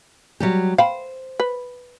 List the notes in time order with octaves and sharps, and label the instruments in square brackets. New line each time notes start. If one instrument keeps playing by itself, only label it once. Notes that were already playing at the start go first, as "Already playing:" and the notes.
[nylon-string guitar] F#3 G3 G4
[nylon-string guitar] C5 [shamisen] F5 G5 B5
[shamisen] B4